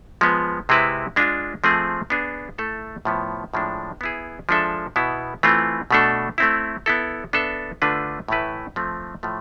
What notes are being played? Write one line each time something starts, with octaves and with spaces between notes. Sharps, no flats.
F3 G#3 B3
C3 G#3 C4 E4 B4
G#3 D4 F4
F3 A3 C4 G#4
B3 D4 G#4
A3 E4 A4
A2 F3 B3 E4
A2 F3 G#3 D4 A4
B3 E4 G#4
F3 G#3 D4 A4 E5
B2 B3 E4
E3 A3 C4 F4
B2 A3 D4 A4
A3 C4 E4
B3 E4 A4
B3 D4 A4 E5
D3 A3 D4 F4 B4
A2 E3 A3 E4 B4
F3 A3 C4
A2 F3 A3